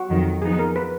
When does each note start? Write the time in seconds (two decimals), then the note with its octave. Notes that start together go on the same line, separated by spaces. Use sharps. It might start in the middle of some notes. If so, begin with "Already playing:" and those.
Already playing: F#4
0.09 F2 D#3 F#3
0.42 F3 B3 D#4 G#4
0.59 A#4
0.76 B4